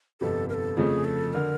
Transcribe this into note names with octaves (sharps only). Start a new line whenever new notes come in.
G1 F2 C3 A4
A#4
A4
F2 C#3 F3 A3 G#4
A4
D3 A#4